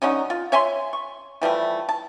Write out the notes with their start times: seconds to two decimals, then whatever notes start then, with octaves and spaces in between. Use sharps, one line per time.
0.02 D3 F#3 C#4 D#4
0.30 F4
0.52 C#5 E5 G#5 C6
0.93 C#6
1.42 E3 F3 G3 A3
1.89 A5